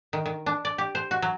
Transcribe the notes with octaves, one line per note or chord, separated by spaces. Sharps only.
D#3
D#3
D4
D5
G4
C5
F#4
F#3